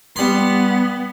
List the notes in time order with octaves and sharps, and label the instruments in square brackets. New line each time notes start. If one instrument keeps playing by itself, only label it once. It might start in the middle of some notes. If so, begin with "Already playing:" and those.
[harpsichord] G3 C6 [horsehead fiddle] B3